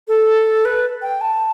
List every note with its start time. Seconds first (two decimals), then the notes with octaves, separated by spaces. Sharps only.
0.08 A4
0.65 B4
1.02 G5
1.21 A5